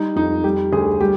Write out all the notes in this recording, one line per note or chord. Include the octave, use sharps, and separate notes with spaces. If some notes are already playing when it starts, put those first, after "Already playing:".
Already playing: G3 D#4
F2 D#4
G3 G4
D2 G#4
G3 G4